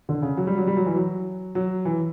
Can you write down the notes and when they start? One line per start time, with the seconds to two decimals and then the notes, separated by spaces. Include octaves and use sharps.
0.09 D3
0.22 C#3
0.37 F#3
0.47 G3
0.58 F#3
0.67 G3
0.77 F#3
0.86 E3
0.96 F#3
1.55 F#3
1.85 E3